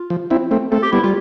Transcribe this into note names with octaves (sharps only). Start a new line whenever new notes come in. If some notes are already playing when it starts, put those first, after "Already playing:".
Already playing: F4
F3
C4 E4
A3 C4
A3 C4 A4
G4
G3 B3 E4
G3 F4